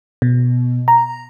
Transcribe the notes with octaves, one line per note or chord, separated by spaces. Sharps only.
B2
A#5